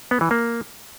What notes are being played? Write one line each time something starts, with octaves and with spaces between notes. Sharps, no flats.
B3
E3
A#3